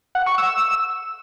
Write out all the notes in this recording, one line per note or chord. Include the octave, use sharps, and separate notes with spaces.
F#5
C#6
E6